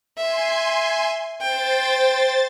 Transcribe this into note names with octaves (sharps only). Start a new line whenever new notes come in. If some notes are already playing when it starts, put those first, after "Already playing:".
E5 G#5 C6
C5 G5 A6